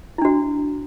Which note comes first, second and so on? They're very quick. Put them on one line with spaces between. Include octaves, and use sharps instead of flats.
E4 D4 F#4